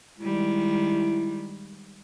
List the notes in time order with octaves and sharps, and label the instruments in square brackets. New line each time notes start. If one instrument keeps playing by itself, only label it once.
[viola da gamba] D#3 G3 G#3 [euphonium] E4